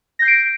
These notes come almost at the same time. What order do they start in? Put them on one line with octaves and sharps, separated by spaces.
A#6 G6 C7 D7